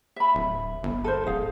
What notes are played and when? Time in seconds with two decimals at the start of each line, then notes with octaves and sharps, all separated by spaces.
0.16 E5 B5
0.35 D1
0.83 G1
1.04 A4 A#4 C5
1.26 D1 G#4 F5